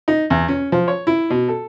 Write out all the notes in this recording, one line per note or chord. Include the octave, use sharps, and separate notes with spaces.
D#4
E2
C#4
F3
C#5
E4
B2
A4